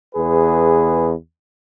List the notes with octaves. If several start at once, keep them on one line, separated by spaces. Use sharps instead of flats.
E2 G#4 B4